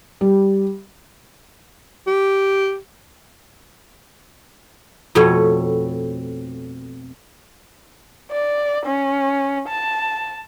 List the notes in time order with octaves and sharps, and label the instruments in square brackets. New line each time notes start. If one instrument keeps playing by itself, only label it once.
[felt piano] G3
[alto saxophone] G4
[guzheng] F2 B2 A3 B3 C#5
[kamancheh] D5
C#4
A5